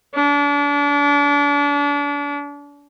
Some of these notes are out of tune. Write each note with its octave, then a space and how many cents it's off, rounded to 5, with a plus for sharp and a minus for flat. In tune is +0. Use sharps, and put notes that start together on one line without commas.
D4 -35